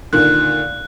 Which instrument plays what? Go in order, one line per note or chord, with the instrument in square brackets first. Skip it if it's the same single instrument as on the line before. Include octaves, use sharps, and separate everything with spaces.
[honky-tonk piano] A#2 D3 D#3 [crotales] F#6